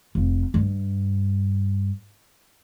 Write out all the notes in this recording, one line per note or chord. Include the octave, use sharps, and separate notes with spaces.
F1
G2